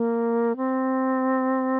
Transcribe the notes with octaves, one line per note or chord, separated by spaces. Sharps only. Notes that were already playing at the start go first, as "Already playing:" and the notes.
Already playing: A#3
C4